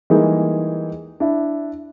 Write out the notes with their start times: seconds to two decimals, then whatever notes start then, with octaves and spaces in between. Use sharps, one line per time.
0.10 E3 G3 G#3 A#3 D#4
1.20 D4 E4